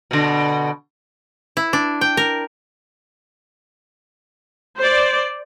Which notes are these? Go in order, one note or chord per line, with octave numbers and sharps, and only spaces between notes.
B2 D3
E4
D4
G5
A#4
C5 D5